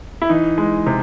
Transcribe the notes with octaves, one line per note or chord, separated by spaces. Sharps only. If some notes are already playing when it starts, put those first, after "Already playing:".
E4
E3 D#4
G#3
C3